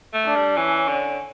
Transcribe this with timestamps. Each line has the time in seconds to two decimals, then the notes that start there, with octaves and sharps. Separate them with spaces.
0.14 A3
0.25 D4
0.35 G3
0.57 E3 C#4
0.89 D3